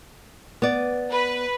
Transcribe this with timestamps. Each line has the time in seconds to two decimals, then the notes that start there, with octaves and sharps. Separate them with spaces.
0.62 B3 D5
1.11 B4